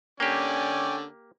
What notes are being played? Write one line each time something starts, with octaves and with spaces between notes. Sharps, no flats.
D3 A#3 C#4 G4 D5 G5 G#5